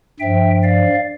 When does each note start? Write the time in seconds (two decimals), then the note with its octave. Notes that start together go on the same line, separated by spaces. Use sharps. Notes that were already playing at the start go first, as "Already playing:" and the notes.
0.19 G2 F3 E5 G5
0.63 D5 F5